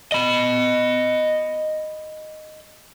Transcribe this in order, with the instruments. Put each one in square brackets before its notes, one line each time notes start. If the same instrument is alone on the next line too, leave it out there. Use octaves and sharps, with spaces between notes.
[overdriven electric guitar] D#5 B5